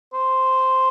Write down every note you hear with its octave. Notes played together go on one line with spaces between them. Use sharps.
C5